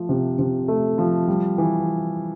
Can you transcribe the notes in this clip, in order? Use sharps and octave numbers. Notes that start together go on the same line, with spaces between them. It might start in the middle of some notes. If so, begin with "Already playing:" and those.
Already playing: F3 A3
C3
C3
A3
F3
G3
E3